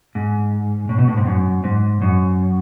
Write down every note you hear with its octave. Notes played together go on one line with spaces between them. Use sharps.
G#2
A2
B2
A2
G#2
F#2
G#2
F#2